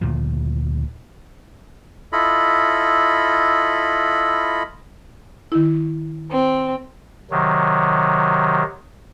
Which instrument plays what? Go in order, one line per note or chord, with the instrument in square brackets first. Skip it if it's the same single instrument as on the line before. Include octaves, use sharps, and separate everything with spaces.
[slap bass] D2 A#2 C#3 F3
[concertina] E4 F4 A4 D#5 B5
[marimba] D#3 E4
[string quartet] C4
[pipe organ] C3 D#3 F#3